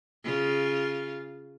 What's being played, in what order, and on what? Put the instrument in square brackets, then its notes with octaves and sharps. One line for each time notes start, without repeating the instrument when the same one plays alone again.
[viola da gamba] C#3 F4